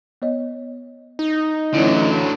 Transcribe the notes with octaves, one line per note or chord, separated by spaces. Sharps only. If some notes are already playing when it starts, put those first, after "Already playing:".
B3 C#5 D#5
D#4
D3 E3 F#3 A3 C#4 E4 D5